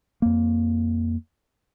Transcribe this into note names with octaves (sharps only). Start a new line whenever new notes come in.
F2 A#3